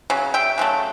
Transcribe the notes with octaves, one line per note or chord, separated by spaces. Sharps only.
C#3 F#3
E5 G5
C#3 F#3 A3